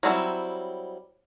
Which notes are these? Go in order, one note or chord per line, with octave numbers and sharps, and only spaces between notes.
F#3 G3 C4 D#4 E4